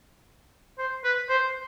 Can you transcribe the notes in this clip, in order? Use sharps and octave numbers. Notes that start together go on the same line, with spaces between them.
C5
B4
C5